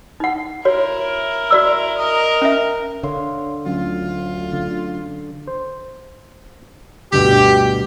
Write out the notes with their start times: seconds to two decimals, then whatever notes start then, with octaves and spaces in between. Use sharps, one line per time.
0.20 D#4 F#5
0.65 E4 F#4 A#4 C#5
1.51 F#4 D5 E6
1.98 A#4 D#5
2.42 C#4 E5
3.03 D3 C#5 F5 C6
3.66 D2 F#3 C#4 F4
4.53 D3
5.47 C5
7.13 D2 G2 B2 G4